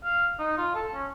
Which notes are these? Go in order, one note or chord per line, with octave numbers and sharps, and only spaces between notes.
F5
D#4
F4
A4
C#4